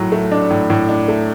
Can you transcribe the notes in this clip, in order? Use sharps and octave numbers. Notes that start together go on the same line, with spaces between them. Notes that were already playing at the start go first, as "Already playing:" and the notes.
Already playing: A2 F#3
A3
D4
A2
A2
D4
A3